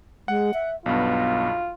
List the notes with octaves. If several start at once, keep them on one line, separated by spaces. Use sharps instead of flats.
G#3 F#5
E5
B1 G2 B3 F4